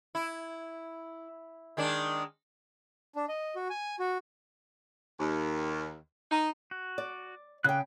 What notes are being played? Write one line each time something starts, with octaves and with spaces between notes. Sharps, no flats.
E4
D#3 G#3 D4
D4
D#5
F#4
G#5
F#4
D#2
D#4
F#4
D5
C#3 G5 D6 F#6